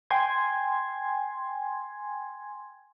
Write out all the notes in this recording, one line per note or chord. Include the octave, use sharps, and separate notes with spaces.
G5 G#5 C6 G#6